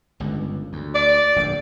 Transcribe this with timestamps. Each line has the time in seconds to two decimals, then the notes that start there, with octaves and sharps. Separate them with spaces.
0.20 G1 C#2 G2
0.73 D2
0.95 D5
1.36 D1 A#1 G#2